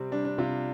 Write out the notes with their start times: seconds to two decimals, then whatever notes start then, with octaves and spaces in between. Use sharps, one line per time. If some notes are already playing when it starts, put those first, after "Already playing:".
Already playing: C3 G3 C4
0.12 G3 D4
0.25 D4
0.38 C3 F4